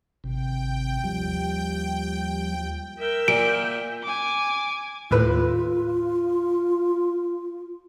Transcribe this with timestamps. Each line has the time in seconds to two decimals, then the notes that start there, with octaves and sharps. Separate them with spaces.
0.24 G#1 C3 G5
1.04 D#2 F3 G3
2.98 A#4 E5 G5
3.28 A#2 D7
4.03 G#5 D6
5.11 D#2 A2 F4 B4